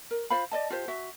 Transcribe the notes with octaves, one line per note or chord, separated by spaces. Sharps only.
A#4
F4 C5 F5 B5
D5 D#5 A5
F4 G4 C5
F#4 E5